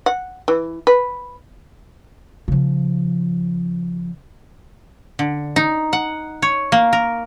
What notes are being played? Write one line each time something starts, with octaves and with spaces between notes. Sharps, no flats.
F#5
E3
B4
C#3 F3
D3
D#4
F#5
C#5
A#3
A#4